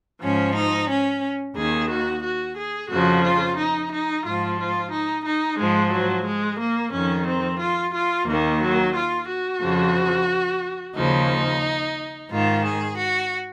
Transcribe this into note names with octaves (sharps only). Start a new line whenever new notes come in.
G#2 F3 C#4
D#4
C#4
D#2 D#3 G#4
F#4
F#4
G#4
F2 C#3 F3 F#4
F4
D#4
D#4
G#2 F3 F4
F4
D#4
D#4
G#2 F3 G#3
F#3
G#3
A#3
F2 D#3 C#4
C4
F4
F4
D#2 D#3 A#3
F#3
F4
F#4
F2 C#3 F3
D#2 C#3 F3 D#4
G#2 D#3 F4
G#4
F#4